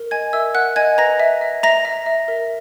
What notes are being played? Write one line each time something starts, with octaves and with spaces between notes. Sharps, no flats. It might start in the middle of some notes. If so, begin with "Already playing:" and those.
Already playing: A#4
D#5 G#5 G#6
A#4 E5 E6
A#4 F#5 F#6
D#5 G#5 G#6
B4 A#5 A#6
E5
E5
E5 A#5 A#6
E5
E5
A#4